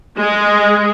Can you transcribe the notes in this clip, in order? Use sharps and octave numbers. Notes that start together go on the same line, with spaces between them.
G#3